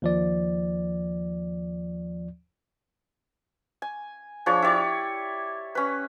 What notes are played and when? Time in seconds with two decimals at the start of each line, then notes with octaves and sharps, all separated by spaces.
0.02 D#2 F3 D5
3.82 G#5
4.46 F3 D4 G#4 C#5
4.62 E4 G4 C#5 D5
5.75 C#4 B4